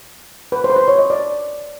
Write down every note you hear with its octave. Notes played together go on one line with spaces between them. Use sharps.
B4
C5
B4
C5
C#5
D#5
D5